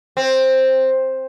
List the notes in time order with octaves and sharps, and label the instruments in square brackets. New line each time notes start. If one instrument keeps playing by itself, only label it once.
[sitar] C4